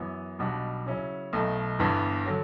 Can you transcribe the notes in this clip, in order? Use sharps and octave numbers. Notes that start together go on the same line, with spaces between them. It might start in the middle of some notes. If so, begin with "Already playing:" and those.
Already playing: F#2 E3 B3
B1 B2 G3 D4 F#4
C#3 F#3 C#4 E4
B1 B2 A3
G1 G2 E3 B3 D4
D3 F#3